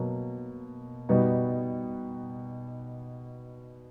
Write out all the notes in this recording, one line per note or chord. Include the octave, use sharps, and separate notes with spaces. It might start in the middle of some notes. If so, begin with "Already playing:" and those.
Already playing: B2 F#3 A#3
B2 G3 B3 D#4 F#4